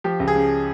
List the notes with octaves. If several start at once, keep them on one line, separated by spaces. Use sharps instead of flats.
F3 G4
C#2
G#4
C#3